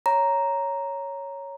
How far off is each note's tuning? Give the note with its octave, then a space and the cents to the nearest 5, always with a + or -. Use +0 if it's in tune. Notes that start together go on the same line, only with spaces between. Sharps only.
C#5 +0 A#5 +0